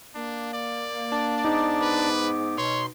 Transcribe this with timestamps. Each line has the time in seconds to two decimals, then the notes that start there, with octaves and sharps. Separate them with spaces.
0.15 A#3 D4
0.54 D5
1.12 D4
1.45 G#2 B3 D#4 D6
1.81 B4
2.58 B2 C#5 C6